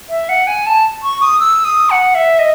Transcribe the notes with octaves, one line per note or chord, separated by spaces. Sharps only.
E5
F#5
G#5
A5
C#6
D#6
E6
D#6
F#5
E5
D#5